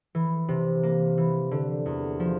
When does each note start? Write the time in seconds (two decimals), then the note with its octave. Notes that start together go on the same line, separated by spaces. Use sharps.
0.15 E3
0.49 C3
0.83 A#3
1.18 E3
1.51 D3
1.86 E2
2.20 F3